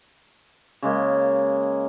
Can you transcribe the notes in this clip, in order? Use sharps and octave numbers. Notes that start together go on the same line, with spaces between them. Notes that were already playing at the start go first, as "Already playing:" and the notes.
C#3 G#3 A#3